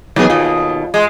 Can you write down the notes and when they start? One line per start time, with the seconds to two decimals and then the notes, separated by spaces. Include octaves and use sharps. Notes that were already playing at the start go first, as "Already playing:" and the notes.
0.16 D#2 E3 F#3 B3 G#4
0.30 D#2 B2 F4
0.94 G#3